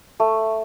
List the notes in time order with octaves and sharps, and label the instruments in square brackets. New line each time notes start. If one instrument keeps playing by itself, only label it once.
[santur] A3